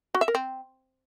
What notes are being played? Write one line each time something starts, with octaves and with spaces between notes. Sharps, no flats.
F#4
E5
A#4
C4